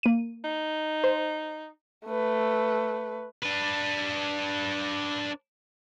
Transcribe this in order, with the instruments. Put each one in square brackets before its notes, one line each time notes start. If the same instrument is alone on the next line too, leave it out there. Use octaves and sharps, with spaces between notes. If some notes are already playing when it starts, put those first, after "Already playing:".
[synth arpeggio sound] A#3 D#7
[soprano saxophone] D#4
[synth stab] C5
[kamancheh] A3 B4
[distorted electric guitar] D4 B4